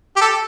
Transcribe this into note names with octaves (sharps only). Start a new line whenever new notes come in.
G4
A4